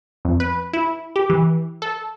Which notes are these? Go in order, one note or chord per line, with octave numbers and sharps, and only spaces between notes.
F2
B4
E4
G4
E3
A4